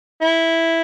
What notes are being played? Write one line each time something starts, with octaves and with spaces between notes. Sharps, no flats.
E4